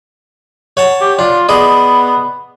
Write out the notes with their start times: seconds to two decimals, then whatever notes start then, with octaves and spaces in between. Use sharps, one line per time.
0.77 C#5 F#5 A5
1.01 G4
1.19 D4 F4
1.49 B3 G#4 D5 D#5